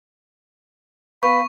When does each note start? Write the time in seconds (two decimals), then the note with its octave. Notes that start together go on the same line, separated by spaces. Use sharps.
1.23 B3 F5 B5 C#6